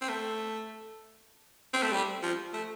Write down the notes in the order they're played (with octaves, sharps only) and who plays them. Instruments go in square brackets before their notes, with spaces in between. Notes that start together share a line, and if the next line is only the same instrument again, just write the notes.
[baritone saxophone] C4
A3
C4
A3
G3
F3
A3